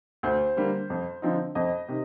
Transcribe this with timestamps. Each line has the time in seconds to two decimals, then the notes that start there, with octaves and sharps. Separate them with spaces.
0.23 D2 C5
0.57 D3 G3 A#3
0.90 F2
1.22 D3 F3 C4 D#4
1.55 F2 D#5
1.88 C3 D#3